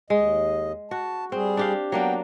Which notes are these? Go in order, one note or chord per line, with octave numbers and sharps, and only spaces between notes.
D#2 G#3 D#5
F#4 A5
G3 C4 G#4
D4 G4 F5
F#3 A#3 B3 D4 G5